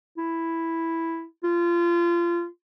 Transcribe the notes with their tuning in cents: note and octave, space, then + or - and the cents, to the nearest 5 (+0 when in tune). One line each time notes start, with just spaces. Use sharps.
E4 +0
F4 -25